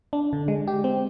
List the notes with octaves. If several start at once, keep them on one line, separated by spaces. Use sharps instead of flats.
D4
D3
G#3
G4
C4